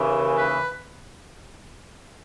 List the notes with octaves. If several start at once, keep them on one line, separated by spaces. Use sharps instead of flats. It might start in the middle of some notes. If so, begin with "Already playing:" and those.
Already playing: D#2 C#3 E3
B4